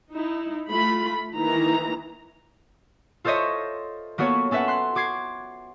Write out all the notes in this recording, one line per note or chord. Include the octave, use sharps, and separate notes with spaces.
D#4 E4
A3 F4 B5
D#3 E3 A#3 E4 A#5
F4 A4 C5 C#5 D#5 E5
A#3 B3 F#4 A4 C#5
C#4 A4 B4 E5 F#5
C6 F#6
F#4 D6 G#6 C7